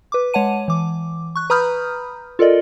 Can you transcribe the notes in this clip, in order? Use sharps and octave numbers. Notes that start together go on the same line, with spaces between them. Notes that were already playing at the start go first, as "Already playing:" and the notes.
B4 D6
G#3 C#5 F#5 A5 D#7
E3 D6
C#6 F#6
B4 A#5 B5 D#6 F6 G6
F4 A4 A#4 D5 D#5